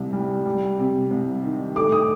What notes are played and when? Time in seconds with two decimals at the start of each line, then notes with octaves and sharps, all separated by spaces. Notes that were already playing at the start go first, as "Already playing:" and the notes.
Already playing: C2 C3
0.13 G3
0.45 G3
0.78 C3
1.11 C2
1.44 D#3
1.76 A3 D6
1.92 D#6